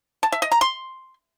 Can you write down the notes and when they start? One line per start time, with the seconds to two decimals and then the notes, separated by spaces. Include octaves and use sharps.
0.23 A5
0.32 E5
0.42 D#5
0.52 A#5
0.61 C6